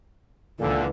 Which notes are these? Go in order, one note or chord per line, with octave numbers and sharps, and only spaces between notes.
C#2 A#2 D3 E3 A4